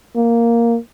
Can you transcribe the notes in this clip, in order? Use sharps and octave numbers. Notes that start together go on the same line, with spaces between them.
A#3